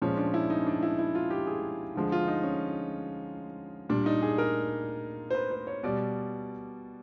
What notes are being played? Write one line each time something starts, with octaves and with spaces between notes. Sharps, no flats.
A#2 F3 G#3 C#4
D4
E4
D#4
C#4
D4
E4
E4
F4
G4
G#4
D3 F3 G#3
F4
D#4
C#4
A#2 G3 D4
D#4
G#4
A#4
C5
B4
C5
C#5
B2 G3 D5